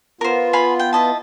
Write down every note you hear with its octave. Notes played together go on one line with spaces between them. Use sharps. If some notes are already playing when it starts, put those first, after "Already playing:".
B3 F4 A#4 C5
F5 G#5 B5
G5
E4 D#5 A5